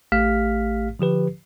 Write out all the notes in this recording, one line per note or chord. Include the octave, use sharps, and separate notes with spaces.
A1 A3 G4 F5 F6 B6
D3 F3 G4 B4